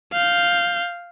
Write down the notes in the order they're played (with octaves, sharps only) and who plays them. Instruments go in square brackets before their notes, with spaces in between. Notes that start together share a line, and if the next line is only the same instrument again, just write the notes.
[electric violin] F5 G6